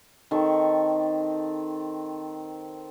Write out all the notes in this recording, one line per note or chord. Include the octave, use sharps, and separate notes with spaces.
D#3 C4 A4 C#6